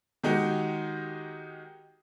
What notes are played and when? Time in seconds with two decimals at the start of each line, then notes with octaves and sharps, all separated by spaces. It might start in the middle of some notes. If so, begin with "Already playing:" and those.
0.23 D#3 G#3 D#4 F#4 G4